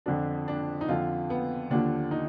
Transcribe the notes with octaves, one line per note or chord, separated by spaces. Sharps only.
F2 D3 F3 D4
D4
D#4
F2 D3 F3 F4
B3
D#2 D3 F3 D4
D#4